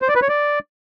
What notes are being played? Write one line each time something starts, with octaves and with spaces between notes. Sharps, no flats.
C5
D5
B4
C#5
D5